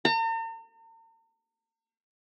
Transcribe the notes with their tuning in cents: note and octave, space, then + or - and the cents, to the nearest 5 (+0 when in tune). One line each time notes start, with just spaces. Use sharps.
A#5 -45